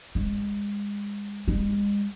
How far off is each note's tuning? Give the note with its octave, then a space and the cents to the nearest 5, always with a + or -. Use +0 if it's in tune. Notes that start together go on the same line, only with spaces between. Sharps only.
G#3 -30
G#3 -40